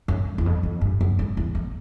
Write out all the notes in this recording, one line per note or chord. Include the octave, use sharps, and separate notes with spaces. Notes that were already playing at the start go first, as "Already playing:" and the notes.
F#2
E2
F2
F#2
G2
F#2
F2
E2
F2